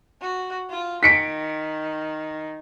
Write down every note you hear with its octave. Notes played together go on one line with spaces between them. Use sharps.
F#4
F4
D#3 B6 C#7 D7